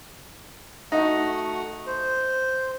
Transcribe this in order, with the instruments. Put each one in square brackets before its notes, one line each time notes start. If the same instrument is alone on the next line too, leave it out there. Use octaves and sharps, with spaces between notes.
[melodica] A3 F#4 F#5 [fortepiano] D#4
[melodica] C5